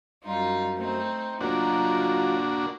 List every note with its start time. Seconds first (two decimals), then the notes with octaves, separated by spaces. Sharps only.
0.24 F#2 G3 D#4 F4
0.77 A3 C4 D#4
1.41 F#3 A#3 D4 D#4 F4 F#4 A#4